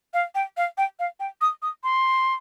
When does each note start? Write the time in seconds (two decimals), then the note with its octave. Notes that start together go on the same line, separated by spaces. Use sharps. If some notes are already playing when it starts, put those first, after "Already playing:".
0.14 F5
0.35 G5
0.57 F5
0.78 G5
0.99 F5
1.20 G5
1.41 D#6
1.62 D#6
1.84 C6